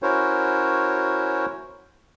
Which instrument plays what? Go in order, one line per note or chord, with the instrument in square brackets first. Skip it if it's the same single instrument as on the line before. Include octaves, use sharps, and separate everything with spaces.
[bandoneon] C#4 E4 F#4 A#4 C5 C#5